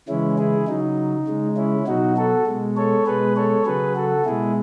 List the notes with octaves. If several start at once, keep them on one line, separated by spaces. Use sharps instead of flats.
C#3 E3 G#3 C#4 E4
E4 G#4
C#3 F#3 D#4
C#3 G#3
C#4 E4
B2 F#3 D#4 F#4
F#4 A4
B2 G#3
A4 C#5
B2 G#3 G#4 B4
A4 C#5
C#3 F#3 G#4 B4
F#4 A4
B2 G#3 E4 G#4